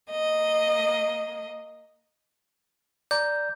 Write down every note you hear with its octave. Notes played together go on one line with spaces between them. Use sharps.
A#3 D#5
D5 A#5 G6